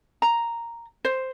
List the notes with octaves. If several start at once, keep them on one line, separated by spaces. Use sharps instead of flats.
A#5
C5